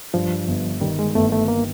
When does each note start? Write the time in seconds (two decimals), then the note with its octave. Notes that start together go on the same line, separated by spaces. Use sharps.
0.14 G2 F3
0.48 G1
0.81 D#3 G3
0.99 G#3
1.15 G1 A3
1.32 A3
1.48 A#3